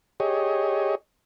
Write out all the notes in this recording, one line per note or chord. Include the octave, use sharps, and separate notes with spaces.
G4 G#4 C#5 D#5